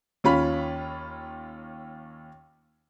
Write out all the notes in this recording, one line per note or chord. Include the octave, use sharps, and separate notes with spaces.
D#2 C#4 F4 B5 B6